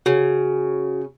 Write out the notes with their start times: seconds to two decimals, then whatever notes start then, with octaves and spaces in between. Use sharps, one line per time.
0.06 C#3 F#4